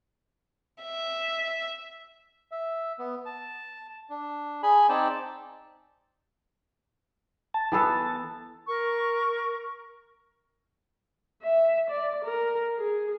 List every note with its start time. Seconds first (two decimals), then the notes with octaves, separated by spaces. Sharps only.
0.83 E5
2.52 E5
2.99 B3
3.26 A5
4.10 D4
4.63 G#4 G#5 B5
4.89 C4 D#4 D5 G5 A5
7.54 A5
7.72 E3 B3 A4
8.68 A#4 C#6
11.43 E5
11.91 D5
12.25 A#4
12.77 G#4